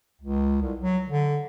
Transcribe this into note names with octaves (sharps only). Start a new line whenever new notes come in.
C#2
C2
F#3
D3